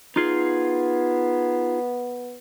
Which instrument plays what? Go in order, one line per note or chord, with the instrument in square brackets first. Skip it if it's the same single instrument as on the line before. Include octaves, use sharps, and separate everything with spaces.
[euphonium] B3 [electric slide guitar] D#4 F4 G#4